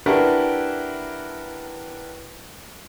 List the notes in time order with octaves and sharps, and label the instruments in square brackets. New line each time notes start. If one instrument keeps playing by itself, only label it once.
[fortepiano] D4 E4 F#4 G4 A#4 B4